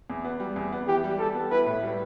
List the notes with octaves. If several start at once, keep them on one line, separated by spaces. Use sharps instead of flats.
E2
B3
G3
E2
B3
E3 G4
G3
G3 A4
B3
E4 B4
A2
G3